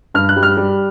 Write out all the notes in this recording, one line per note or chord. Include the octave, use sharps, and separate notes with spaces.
G2 F6
F#6
G3
F6
G3